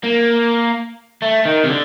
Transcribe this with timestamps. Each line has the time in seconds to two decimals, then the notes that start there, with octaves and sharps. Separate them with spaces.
0.04 A#3
1.22 A3
1.45 D#3
1.64 C3
1.69 D3